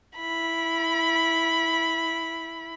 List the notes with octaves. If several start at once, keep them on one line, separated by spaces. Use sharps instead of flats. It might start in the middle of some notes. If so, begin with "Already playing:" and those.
E4 B5